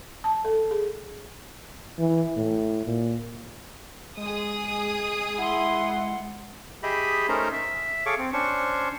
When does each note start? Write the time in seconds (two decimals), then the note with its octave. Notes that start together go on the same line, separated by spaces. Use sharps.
0.24 A5
0.45 A4
0.71 G#4
1.99 E3
2.37 A2
2.85 A#2
4.17 G#3 G#4 D#6
5.38 E4 F#5 C6
6.83 G4 G#4 D#5 E5 B5
7.29 A3 C#4 D#4 A#4 C5 A#5
7.52 E5
8.06 G#4 A4 C#5 F5 C#6 D6
8.18 C4
8.33 C#4 D4 C5 C#6